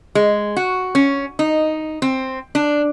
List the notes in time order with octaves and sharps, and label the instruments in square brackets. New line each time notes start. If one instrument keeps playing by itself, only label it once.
[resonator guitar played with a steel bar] G#3
F#4
C#4
D#4
C4
D4